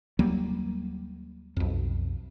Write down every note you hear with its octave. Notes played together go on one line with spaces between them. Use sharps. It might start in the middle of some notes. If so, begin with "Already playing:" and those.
D#2 F#3 G3 A#3
B1 F2